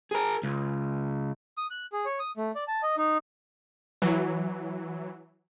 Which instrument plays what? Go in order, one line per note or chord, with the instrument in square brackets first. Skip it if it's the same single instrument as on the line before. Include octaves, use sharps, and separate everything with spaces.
[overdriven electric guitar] G#4 A#4
C#2
[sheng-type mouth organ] D#6
F#6
G#4
C#5
D#6
A3
D5
A5
D#5
D#4
[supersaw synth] E3 F#3